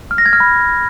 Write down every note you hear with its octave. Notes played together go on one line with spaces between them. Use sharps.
F6
A#6
G#6
F6
B5